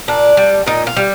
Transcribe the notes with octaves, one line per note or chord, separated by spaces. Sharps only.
A#2 D4
G3
A#2 D#4
F4
G3